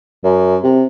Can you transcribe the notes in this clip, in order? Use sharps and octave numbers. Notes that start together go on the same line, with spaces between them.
F#2
C3